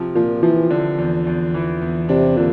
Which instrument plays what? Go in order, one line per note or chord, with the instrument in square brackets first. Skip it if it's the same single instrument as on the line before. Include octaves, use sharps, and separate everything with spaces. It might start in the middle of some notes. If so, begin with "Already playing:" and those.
Already playing: [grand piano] C3 F3
[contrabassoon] A#2 [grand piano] F3
[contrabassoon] E3 [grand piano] F3
[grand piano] D3
E2
E2
E3
E2
[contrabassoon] C3 [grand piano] D4
[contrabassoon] A#2 [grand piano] D3